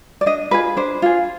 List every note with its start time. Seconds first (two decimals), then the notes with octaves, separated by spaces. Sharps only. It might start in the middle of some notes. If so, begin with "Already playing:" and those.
0.21 D5
0.26 D4 D#5
0.51 F4 G#4 B4
0.77 D4 C5
1.02 F4 G#4